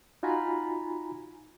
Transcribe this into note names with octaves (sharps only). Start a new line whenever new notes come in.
D#4 F4 F#4 G#5 A#5 B5